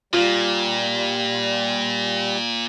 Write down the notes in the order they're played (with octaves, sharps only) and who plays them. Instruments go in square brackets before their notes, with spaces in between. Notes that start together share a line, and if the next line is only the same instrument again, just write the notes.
[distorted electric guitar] A#2 [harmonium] G3 [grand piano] F4